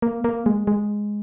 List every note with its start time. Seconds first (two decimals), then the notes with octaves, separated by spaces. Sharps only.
0.02 A#3
0.24 A#3
0.46 G#3
0.67 G#3